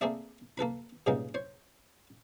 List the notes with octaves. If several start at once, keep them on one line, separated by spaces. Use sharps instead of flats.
A3 A#3 C4 G#4 D5 E5
A#3 A4 B4 B5
G2 A#2 C#3 G#3 B3 D#4
C5 C#5